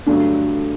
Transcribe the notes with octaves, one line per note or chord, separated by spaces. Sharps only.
G2 D3 F#3 A3 D4